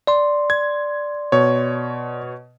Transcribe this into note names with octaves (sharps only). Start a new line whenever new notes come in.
D5 C6
G#6
B2 C#5